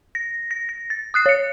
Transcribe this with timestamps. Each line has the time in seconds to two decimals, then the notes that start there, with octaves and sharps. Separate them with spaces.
0.15 A#6
0.51 A#6
0.69 A#6
0.90 A6
1.14 D#6 F#6 C7
1.26 C#5 C#7